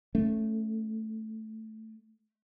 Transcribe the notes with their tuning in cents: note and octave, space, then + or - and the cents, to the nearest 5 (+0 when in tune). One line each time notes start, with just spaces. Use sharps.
A3 +0 C#4 +0